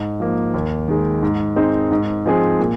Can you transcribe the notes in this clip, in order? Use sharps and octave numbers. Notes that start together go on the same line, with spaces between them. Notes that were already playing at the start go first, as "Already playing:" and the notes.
Already playing: G#2
F3 A#3
D#2
D#3 G#3
G#2
G#3 C4 D#4 C5
G#2
F3 G#3 C4 G#4
A#2